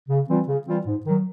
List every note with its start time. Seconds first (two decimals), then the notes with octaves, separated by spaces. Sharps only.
0.09 C#3
0.28 E3 G3 C4 F4
0.48 C#3
0.67 E3 G3 C4 F4
0.86 G#2
1.06 D#3 F#3